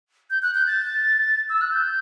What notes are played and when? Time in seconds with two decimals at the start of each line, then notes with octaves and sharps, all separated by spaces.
0.30 G6
0.42 F#6
0.54 G6
0.67 A6
1.49 E6
1.61 F#6
1.72 G6